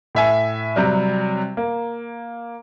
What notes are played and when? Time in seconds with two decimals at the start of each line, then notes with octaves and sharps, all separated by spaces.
0.15 A2 E5 G#5
0.76 C3 F#3 G3
1.57 A#3